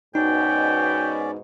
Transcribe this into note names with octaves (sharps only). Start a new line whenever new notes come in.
G#2 B2 C#4 D#4 D5 G5